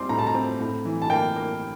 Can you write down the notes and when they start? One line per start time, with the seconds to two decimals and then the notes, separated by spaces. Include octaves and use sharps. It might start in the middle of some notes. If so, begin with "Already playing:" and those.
Already playing: G3 C4 C6 D6
0.09 A2 A#5
0.19 A5
0.27 A#5
0.35 C4
0.61 A2
0.85 E3
1.02 A5
1.10 A#3 G5
1.36 A#3